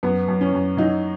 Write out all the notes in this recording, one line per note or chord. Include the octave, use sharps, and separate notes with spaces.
F#2 B3
F#2
C#4
F#2
F#3 D#4